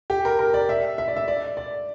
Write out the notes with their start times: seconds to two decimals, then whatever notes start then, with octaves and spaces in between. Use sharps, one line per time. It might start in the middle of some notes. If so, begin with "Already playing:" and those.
0.10 G4
0.25 A#4
0.39 A#4
0.54 D5
0.69 E5
0.98 E5
1.08 D5
1.17 E5
1.28 D5
1.57 D5